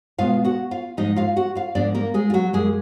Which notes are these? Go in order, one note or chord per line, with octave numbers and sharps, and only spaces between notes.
B2 G#3 B3 F4 F5
F#4 F#5
F4 F5
G#2 F3 G#3 D#4 D#5
F4 F5
F#4 F#5
F4 F5
G#2 F3 A#3 D4 D5
A#3 A#4
G#3 G#4
F4
F#3 F#4
F#2 F3 G#3 A#3 G#4